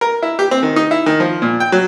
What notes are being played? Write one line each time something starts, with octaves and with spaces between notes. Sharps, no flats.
A#4
E4
G4
C4
D#3
D#4
E4
D#3
F3
A#2
G5
F#3